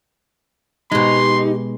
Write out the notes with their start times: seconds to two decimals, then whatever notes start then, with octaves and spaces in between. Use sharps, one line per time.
0.92 B2 G#3 D#4 G4 C6